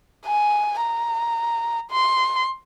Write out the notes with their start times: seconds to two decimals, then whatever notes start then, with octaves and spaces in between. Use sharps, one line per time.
0.26 G#5
0.81 A#5
1.91 C6